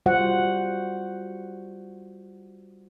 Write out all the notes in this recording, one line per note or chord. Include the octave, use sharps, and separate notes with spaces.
G3 F4 F#4 C5 F#5